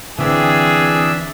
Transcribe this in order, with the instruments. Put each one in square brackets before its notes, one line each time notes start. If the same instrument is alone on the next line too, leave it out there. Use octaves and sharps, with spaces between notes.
[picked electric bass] D3 [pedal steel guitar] E3 C4 [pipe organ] D4 E5 [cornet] G#4